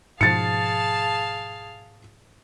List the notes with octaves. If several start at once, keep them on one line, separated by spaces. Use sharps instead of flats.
G#2 B2 F3 G#4 F5 A5 A6 C#7